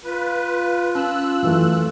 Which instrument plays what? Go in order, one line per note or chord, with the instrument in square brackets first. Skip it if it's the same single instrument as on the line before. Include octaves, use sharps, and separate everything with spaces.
[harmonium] F4 [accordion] B4
[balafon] C#4 [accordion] E6 F#6
[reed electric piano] F#2 E3 A3